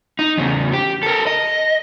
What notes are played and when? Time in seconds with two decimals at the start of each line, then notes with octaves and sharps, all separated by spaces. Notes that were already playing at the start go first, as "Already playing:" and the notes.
0.19 D#4
0.38 E2 C#3
0.73 G4
1.03 A4 A#4
1.27 D#5